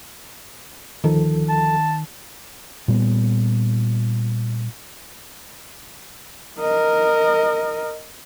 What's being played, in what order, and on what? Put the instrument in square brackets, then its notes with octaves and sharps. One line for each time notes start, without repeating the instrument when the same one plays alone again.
[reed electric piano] D2 F3 A4 [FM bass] D#3
[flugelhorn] A5
[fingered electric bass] A#2 G3 B3
[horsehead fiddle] A#4 D#5